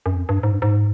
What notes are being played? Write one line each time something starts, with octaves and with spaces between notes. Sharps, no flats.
F#2
F2
G2
G#2
G2
G#2